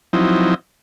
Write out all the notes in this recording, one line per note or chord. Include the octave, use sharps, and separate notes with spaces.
F3 F#3 C4 D#4 E4